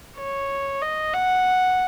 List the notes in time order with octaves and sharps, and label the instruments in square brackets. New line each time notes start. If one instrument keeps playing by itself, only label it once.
[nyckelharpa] C#5
D#5
F#5